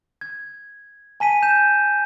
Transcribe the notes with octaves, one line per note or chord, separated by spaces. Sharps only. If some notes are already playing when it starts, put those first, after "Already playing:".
G#6
G#5 A5 B6 D#7
G6 E7